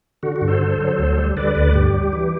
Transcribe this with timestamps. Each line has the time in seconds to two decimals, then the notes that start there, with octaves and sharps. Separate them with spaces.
0.23 D3 F#4
0.36 F#4
0.41 G2
0.48 A4 C5
0.61 D3
0.80 F#3
0.99 D2
1.17 G3
1.37 D3 B4 D5
1.55 D2 B4 D5
1.74 G2 G4
1.94 G3
2.13 E3